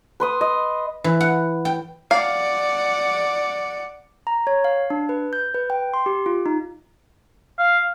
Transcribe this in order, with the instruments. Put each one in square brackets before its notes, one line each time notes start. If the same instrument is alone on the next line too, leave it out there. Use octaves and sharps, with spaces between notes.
[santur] B4 C6 D#6
D#5
[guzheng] E3
F#5
G5
[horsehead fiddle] D5 F#5 [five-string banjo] F5
[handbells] A#5
C#5
F5
D4
B4
G6
B4
G5
C6
G4
F4
D#4
[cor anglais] F5